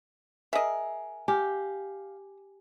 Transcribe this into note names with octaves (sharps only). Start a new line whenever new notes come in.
G#4 A#4 D#5 E5
G4 F5 G#5